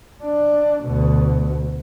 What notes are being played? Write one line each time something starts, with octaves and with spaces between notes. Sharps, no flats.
D4
D2 B2